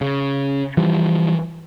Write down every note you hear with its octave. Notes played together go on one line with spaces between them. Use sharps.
C#3
E3 F3 G3